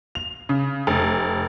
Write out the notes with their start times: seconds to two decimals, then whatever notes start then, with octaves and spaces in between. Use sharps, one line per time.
0.15 F7
0.49 C#3
0.87 F1